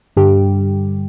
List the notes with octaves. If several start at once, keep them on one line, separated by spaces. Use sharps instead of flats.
G2 D3 G3 G4